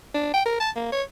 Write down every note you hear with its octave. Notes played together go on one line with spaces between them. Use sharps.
D4
G5
A#4
A5
A#3
C#5